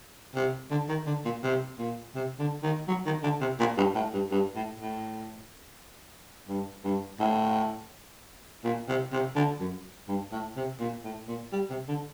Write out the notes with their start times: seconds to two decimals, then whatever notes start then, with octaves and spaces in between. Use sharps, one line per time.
0.35 C3
0.71 D3
0.89 D#3
1.07 D3
1.25 A#2
1.43 C3
1.79 A#2
2.15 C3
2.39 D3
2.63 D#3
2.88 F#3
3.06 D#3
3.23 D3
3.41 C3
3.60 A#2
3.77 G2
3.95 A2
4.13 G2
4.32 G2
4.56 A2
4.80 A2
6.49 G2
6.84 G2
7.20 A2
8.64 A#2
8.89 C3
9.13 C3
9.36 D3
9.60 F#2
10.08 G2
10.32 A2
10.57 C3
10.80 A#2
11.04 A2
11.28 A#2
11.53 G3
11.70 C3
11.88 D3